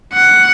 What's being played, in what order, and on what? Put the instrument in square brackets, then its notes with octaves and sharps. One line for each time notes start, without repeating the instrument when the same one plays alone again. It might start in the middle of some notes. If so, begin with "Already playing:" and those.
[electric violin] F#5